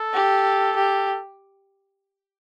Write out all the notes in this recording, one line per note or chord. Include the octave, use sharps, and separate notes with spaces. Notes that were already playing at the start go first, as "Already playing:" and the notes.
Already playing: A4
G4
G4